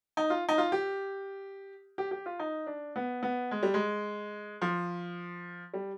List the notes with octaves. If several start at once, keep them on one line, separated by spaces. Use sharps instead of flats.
D#4
F4
D#4
F4
G4
G4
G4
F4
D#4
D4
B3
B3
G#3
G3
G#3
F3
G3